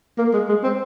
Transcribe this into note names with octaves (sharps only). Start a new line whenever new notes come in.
A#3
G#3
G#3
C4